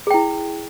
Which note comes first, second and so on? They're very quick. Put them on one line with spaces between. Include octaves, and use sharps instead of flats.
G#4 G5 E4